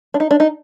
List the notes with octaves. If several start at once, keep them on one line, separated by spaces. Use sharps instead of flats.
D4
D#4
D4
D#4